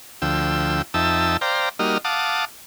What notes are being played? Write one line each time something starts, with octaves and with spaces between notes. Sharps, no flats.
D2 F3 G5 E6
F2 D#4 E5 G5 A5 E6
C5 D5 F5 G5 A#5
G3 A#3 D#4 F#4 D#5 F6
F5 F#5 A5 D6 D#6